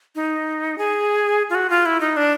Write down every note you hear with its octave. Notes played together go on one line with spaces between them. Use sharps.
D#4
G#4
F4
F#4
F4
E4
D#4
D4